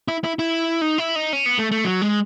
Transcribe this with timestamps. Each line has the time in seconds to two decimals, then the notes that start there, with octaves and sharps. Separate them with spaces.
0.08 E4
0.24 E4
0.39 E4
0.81 D#4
0.98 E4
1.16 D#4
1.33 C#4
1.46 B3
1.59 A3
1.72 A3
1.84 F#3
2.02 G#3